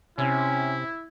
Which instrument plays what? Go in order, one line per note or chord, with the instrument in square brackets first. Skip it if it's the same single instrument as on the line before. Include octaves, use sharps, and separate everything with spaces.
[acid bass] C3 [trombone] C#4 [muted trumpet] E4